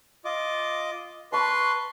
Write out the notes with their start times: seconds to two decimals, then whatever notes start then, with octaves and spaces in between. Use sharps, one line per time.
0.25 F4 D#5 D6
1.32 B4 A5 C6 C#6